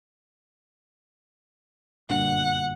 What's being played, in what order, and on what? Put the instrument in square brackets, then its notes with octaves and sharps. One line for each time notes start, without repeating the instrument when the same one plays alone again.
[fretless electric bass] G1 A#2 D4 [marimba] F#2 D3 G3 [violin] F#5